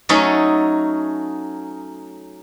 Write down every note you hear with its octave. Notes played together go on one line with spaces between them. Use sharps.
F#3 A3 C#4 D#4 A4